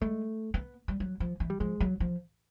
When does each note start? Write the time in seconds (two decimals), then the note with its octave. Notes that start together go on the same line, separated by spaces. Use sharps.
0.01 G#3 A3
0.54 B3
0.88 G3
1.00 F#3
1.20 F3
1.40 E3
1.50 G3
1.60 F3 G#3
1.80 F#3
2.00 F3